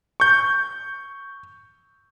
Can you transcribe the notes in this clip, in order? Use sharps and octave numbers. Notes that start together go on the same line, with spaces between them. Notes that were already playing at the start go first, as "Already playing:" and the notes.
C#6 G6